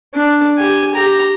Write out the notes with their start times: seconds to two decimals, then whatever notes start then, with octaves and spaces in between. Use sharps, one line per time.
0.14 D4
0.58 G4 G#5
0.94 G4 A#5